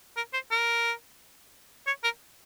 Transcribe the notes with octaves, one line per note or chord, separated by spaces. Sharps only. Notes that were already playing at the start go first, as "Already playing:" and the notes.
A#4
C5
A#4
C#5
A#4